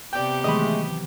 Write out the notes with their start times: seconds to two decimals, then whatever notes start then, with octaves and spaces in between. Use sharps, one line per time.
0.13 C3 B3 G4 D5 G5
0.44 D#3 E3 F#3 G#3 A3 D#5 B5